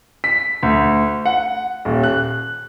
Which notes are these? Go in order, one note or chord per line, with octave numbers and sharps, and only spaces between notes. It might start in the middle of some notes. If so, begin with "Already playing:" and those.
B6
D2
F#5
D#1
F#6